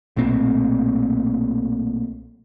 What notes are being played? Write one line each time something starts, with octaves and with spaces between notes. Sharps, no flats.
B1 A#2 A3 C4